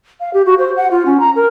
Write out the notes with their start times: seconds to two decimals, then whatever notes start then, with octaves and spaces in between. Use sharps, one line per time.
0.20 F5
0.34 G4
0.46 F#4
0.58 C5
0.77 F#5
0.91 F4
1.06 C#4
1.20 A#5
1.36 A#4